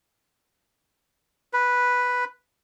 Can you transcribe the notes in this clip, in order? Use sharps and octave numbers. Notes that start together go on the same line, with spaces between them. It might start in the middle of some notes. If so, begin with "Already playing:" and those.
B4